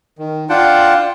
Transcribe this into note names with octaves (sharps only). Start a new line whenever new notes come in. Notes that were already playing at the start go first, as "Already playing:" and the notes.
D#3
D4 F4 F#5 G5 A5